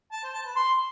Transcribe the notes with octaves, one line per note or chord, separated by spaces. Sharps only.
A5
C5
A5
B4
C6